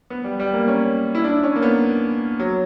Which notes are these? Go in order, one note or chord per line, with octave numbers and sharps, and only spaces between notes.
B3
G3
G3
A#3
C#4
E4
D4
C#4
A#3
B3
F#3